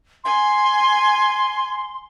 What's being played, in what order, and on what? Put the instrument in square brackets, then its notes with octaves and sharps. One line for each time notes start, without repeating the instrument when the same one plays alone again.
[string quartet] G#5 [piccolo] C6